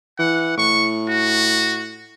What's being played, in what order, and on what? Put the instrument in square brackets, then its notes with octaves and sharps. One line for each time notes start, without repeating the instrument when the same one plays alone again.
[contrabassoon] E3 [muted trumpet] F#5
[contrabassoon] A2 [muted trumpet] C#6
[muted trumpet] F#4